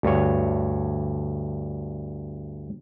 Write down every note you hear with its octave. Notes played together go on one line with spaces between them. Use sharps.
D2 G2 C#5